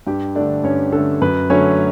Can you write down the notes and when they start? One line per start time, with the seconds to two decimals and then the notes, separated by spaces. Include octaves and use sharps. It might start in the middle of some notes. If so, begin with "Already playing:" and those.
0.07 G2 G4 G5
0.35 A3 D4 D5
0.40 D3
0.64 G2 C#4 C#5
0.92 D3 A4
0.97 A3
1.22 F#2 B4
1.50 D3 F#3 A3 C#4 C#5